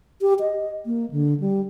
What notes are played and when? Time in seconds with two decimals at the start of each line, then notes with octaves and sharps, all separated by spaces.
0.22 G4
0.40 D#5
0.86 A#3
1.11 D3
1.40 G3